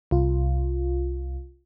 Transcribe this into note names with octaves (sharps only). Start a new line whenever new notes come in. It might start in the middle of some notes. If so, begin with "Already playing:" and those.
C2 F4